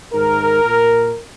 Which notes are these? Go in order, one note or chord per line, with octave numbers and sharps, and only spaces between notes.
G#2 D#3 A#4
A#2